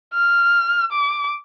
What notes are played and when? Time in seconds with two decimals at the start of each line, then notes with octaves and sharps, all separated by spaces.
0.14 F6
0.92 D6